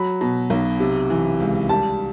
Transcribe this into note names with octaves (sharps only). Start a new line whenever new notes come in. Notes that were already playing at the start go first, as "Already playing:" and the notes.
Already playing: F#3 B5
B2
B1
C3
E3
C#2
G3 A5